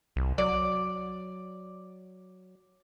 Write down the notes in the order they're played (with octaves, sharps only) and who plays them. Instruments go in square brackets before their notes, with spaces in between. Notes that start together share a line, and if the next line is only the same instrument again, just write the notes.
[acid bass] C2
[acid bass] F#3 [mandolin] D5